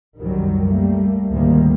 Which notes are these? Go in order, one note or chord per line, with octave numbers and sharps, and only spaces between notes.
C2 F#2 D#3 F#3 G3
G3 A3 A#3
D2 G#2 B2 D#3 G3 A#3